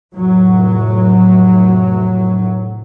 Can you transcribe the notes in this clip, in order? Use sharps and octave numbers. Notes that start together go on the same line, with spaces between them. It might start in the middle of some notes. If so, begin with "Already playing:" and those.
F1 A2 F#3